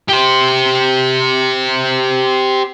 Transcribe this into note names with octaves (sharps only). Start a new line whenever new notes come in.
G4 C5